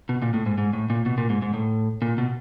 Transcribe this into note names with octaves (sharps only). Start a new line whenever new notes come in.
B2
A#2
A2
G#2
G#2
A2
A#2
B2
A#2
G#2
G#2
A2
A#2
B2